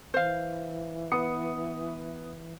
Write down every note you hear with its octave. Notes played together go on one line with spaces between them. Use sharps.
E3 C5 F5
B3 D#6 C#7